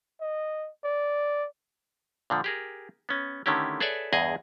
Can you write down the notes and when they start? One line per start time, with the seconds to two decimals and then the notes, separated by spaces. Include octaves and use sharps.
0.21 D#5
0.84 D5
2.30 A#2 D3 F3
2.44 G4 G#4 A#4
3.09 B3 C#4
3.46 D3 D#3 A3 C#4 E4 G4
3.80 G#4 A4 B4 C#5 D5 E5
4.13 E2 G2 G#4 D#5 G#5